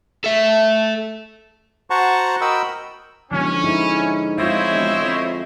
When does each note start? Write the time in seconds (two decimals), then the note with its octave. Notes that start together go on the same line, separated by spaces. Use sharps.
0.24 A4 E5
1.90 F#4 C5 F#5 A5 A#5 C#6
2.41 F#4 A#4 D#5 G5 B5 E6
3.31 E1 D3 F3 C#4
3.64 G#2 E4
4.38 G#3 C4 E4 F4 C5 C#5 D#5 E5
4.71 E1
5.01 F2